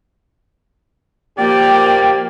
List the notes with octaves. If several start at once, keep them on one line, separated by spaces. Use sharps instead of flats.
A#2 F3 A#3 G4 D5 G5